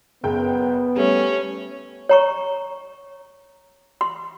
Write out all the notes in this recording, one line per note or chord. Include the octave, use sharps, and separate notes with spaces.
F#1 C#3 B3 G5
G3 A3 C#4
C#5 A#5 C#6
C6